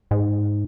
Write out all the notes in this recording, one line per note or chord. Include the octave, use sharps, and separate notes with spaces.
G#2